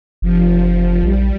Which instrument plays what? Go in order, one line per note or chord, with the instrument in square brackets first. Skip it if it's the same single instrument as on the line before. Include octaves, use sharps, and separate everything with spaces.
[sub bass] F#1 [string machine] F3
[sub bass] A#1 [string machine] G3